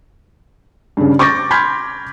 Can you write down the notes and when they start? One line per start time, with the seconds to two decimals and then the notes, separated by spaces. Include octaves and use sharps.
0.97 G2 C#3
1.19 C#6 D6 G6 A6 A#6
1.51 B5 C6 F6 G6 G#6 B6